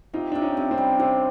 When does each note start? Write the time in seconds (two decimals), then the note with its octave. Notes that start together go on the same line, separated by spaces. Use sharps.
0.13 C3 D#4 F4
0.32 C3 D4
0.42 C#4 D#4
0.57 C3
0.71 C4 D4
0.78 G3
0.99 C3 C4 D4